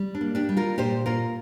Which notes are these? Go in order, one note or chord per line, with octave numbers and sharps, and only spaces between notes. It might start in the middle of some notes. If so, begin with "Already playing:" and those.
Already playing: G3
D4
A#3
D4 G4
G3
F4 A#4
A#2 G4 C5
A#3 F4 A#4